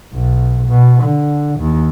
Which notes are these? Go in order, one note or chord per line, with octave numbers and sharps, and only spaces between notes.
B1
B2
D3
D#2